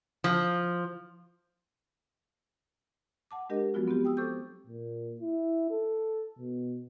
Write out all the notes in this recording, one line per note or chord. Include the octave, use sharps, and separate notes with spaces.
F3
F#5 A5 D6
G#3 D4 G4 A#4 D#5
F3 F#3 G#3 B3 F4 F#4
B3 C4 F4 G4
G5 D#6 E6
A4 C5 C#6 D6 E6 G6
A#2
E4
A4
B2